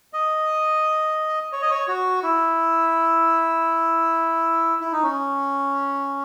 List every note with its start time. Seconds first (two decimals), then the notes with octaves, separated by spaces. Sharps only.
0.13 D#5
1.52 C#5
1.62 D#5
1.71 C#5
1.88 F#4
2.23 E4
4.81 E4
4.92 D#4
5.03 C#4